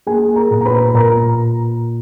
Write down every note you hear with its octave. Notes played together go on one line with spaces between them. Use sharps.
A#3 G#4 G#5
A#4 A#5
A#2
A#5
B4 B5
A#2 A#4 A#5